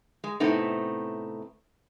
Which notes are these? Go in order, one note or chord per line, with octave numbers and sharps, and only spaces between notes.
G#3
A2 C3 A3 B3 C4 D#4